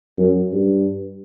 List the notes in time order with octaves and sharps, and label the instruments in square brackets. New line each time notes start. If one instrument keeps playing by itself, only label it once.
[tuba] F#2
G2